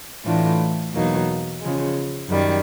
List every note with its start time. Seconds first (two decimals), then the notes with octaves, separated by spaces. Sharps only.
0.25 A2 E3 A3 D4 F4
0.93 E2 B2 F#3 A#3 D#4
1.61 C#3 F3 G#3
2.28 F#2 D#3 G3